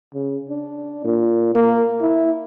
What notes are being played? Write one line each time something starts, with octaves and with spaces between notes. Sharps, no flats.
C#3
D4
A#2
A#3
E4